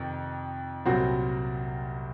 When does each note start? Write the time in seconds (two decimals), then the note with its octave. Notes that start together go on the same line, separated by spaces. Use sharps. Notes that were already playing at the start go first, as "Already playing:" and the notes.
Already playing: F2 C3 D#3
0.85 C2 A#2 F#3 C4 F#4